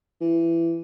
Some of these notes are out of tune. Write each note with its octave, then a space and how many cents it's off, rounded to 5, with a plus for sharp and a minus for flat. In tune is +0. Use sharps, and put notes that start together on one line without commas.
E3 +20